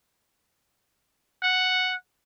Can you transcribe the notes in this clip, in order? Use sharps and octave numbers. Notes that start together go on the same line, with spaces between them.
F#5